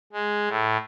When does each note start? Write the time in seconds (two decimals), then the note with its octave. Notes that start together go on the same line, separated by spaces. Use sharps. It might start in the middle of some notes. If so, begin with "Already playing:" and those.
0.13 G#3
0.49 A2